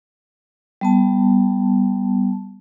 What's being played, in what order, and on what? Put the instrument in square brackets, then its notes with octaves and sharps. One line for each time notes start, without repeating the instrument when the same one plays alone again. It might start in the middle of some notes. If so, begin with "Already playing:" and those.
[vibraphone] G3 B3 A5